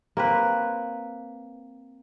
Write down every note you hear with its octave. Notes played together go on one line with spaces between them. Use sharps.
A#3 C4 B4